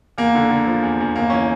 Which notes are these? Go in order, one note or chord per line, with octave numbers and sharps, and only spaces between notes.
E2 A#3
D3
D3
F3
E2
E2
G1 A#3
E3 C#4